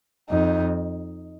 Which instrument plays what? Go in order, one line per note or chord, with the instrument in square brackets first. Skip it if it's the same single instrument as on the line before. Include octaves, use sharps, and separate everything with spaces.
[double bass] F2 [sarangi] D#4